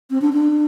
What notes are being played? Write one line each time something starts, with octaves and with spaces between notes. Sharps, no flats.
C4
D4
D4